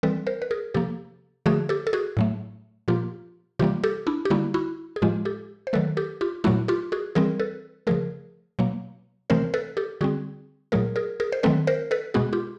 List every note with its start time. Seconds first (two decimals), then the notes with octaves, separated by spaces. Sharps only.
0.03 E3 G3 C4 A4 B4
0.27 A#4 C5
0.42 B4
0.51 G#4 A#4
0.74 C3 F3 A#3 G4 A4
1.46 D3 F3 A3 F#4 G#4
1.69 G4 A4
1.87 A4
1.93 F#4 G#4
2.17 A2 F#3 A3
2.88 A#2 F3 A#3 F4 G4
3.59 C3 E3 G3 A#3 F4 G4
3.84 G4 A4
4.07 D4 E4
4.25 G4
4.30 D3 G3 A#3 E4 F#4
4.54 E4 F#4
4.96 G#4
5.02 A2 F3 G#3 F4 G4
5.25 G4 A4
5.67 C5
5.73 D#3 F#3 A3 A4 B4
5.97 G4 A4
6.21 F4 G4
6.44 A#2 F#3 A3 E4 F#4
6.68 F4 G4
6.92 F#4 G#4
7.15 E3 G3 C4 G#4 A#4
7.40 A4 B4
7.87 C#3 F3 A3 G#4 A#4
8.59 B2 F#3 A#3
9.30 C3 E3 A3 C4 A#4 C5
9.54 A4 B4
9.77 G4 A4
10.01 D3 G3 C4 F#4 G#4
10.72 A#2 F#3 A3 G#4 A#4
10.96 G#4 A#4
11.20 G#4 A#4
11.32 C5
11.43 D#3 F#3 A3 C4 A4 B4
11.67 A#4 C5
11.91 A4 B4
12.14 B2 G#3 B3 F#4 G#4
12.33 F4 G4